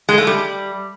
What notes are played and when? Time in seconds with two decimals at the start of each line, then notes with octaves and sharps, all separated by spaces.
0.09 G#3
0.18 A3
0.27 G3